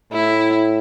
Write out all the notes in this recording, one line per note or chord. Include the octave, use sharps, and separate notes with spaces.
A2 E4